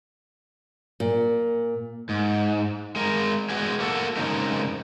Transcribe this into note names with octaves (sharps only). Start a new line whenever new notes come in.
A#2
G#2
G#3 A#4
G#3 B3 F#4 G#4
A#3 F#4 A4
F2 C#3 G#3 D#4 A#4